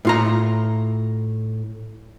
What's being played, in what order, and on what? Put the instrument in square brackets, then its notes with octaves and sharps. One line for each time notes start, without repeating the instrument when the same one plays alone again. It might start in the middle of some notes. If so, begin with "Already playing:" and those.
[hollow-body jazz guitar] A2 F4 A#5